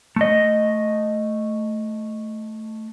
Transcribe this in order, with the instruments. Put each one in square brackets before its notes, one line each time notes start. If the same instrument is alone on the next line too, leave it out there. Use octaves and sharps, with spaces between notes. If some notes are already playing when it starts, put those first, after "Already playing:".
[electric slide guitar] A3 D#5